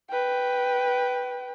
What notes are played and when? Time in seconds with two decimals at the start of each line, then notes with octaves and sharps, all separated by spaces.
0.10 B4 G5